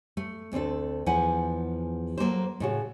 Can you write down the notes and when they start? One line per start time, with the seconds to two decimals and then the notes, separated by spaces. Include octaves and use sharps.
0.17 A3
0.53 D2 C4 D4 A4
1.06 E2 F3 E4 F#5 G#5
2.18 F#3 A#3 A4 C5
2.60 A2 C#3 F#4